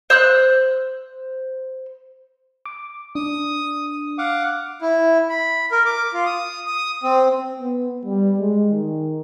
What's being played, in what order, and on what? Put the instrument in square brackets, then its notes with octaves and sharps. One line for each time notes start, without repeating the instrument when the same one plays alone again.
[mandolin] C5 E6 F#6
[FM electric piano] D6
[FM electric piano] D4 [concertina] D#6
[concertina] F5 F#5 D6
[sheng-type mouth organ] E4
B5
A#4
D6
F4
D#6
D#6
C4
[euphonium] B3
G3
G#3
D#3